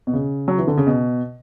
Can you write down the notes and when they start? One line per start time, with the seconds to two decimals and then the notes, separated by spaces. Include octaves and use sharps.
0.07 B2
0.13 C#3
0.48 F#3
0.58 E3
0.67 D3
0.77 C#3
0.87 B2